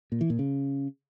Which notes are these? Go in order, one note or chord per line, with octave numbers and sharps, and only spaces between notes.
A#2
E3
A#2
C#3